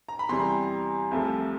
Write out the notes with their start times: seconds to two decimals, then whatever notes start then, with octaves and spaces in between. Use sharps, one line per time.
0.09 A#5
0.19 B5
0.29 E2 C3 E3 G3 A#5 C6
1.11 C2 C3 F3 A3